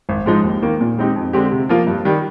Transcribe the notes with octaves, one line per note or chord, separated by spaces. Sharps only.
G#1
G#2 F3 G#3 D#4
D#2
D#3 A#3
A#2
G#3 C4 D#4 G4
F2
D3 G#3 C4 G4
C3
F3 A#3 F4
G2
D#3 G3